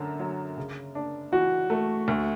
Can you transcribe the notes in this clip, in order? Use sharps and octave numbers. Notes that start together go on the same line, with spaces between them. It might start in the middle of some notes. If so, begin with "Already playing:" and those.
Already playing: F#2 D3
F#3
C#3
D4
E3 F#4
A3
D2